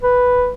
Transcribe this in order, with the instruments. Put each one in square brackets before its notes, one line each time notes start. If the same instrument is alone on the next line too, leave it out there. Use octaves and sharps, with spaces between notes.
[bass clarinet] B4